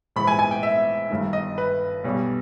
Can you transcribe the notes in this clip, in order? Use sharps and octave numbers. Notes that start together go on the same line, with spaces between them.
A#1 G#2 E3 B5
G#5
G#5
G5
E5
G1 G2 D#3
D#5
B4
B1 B2 G3